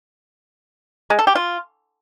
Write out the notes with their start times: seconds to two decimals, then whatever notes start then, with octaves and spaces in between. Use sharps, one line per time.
1.10 G#3
1.19 A4
1.27 G4
1.35 F4